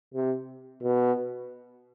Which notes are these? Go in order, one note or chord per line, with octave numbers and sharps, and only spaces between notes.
C3
B2